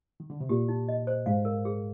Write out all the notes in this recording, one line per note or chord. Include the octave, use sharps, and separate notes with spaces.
D#3
D3
C3
A#2 G4
D#4
D#5
C5
G#2 F5
A#4
G#4